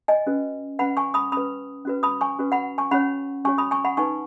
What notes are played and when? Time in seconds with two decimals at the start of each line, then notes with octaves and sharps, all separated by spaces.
0.08 D#5 G#5
0.27 C#4 F#4 B4
0.79 C#4 B4 F#5 B5
0.97 G#5 C#6
1.14 B5 D#6
1.32 C#4 B4 B5 D#6
1.85 C#4 F#4 B4
2.03 B5 D#6
2.21 G#5 C#6
2.39 C#4 F#4 B4
2.52 F#5 B5
2.78 G#5 C#6
2.91 C#4 F#4 C#5 F#5 B5
3.45 C#4 F#4 C#5 G#5 C#6
3.58 B5 D#6
3.71 G#5 C#6
3.85 F#5 B5
3.97 D#4 B4 G#5 C#6